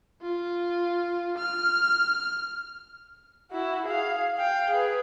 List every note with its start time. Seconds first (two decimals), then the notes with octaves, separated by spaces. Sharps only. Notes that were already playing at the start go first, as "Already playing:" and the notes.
0.22 F4
1.38 F6
3.52 E4 F#4
3.86 G#4 F5
4.36 F5 G5
4.70 G#4 B4